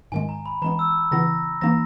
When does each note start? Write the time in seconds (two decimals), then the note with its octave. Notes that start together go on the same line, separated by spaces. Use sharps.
0.12 G#2 D#3 G#3 G#5
0.29 A#5
0.46 B5
0.62 E3 G#3 B3 A#5
0.79 E6
1.11 C#3 E3 B3 E4 A#5 A#6
1.61 E3 A#3 D#4 A#5 A#6